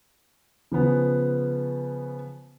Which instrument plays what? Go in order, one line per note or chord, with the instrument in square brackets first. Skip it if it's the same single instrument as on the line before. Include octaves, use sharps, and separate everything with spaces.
[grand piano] C#3 F3 B3 C#4